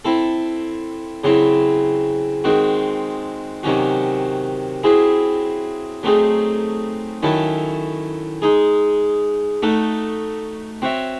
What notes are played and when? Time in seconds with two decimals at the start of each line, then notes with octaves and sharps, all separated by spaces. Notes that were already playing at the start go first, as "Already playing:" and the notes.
0.05 C4 E4 A4
1.24 C#3 F#3 C4 E4
2.44 D#3 G#3 C4 F#4
3.63 C3 D#3 F#3 C#4 F#4
4.84 F#3 C4 E4 G#4
6.03 F#3 A3 C4 D#4 G#4
7.23 D#3 F#3 C#4 E4 A4
8.42 G#3 D#4 G#4
9.62 A3 D#4 F#4 A4
10.82 C4 F#4 C#5 E5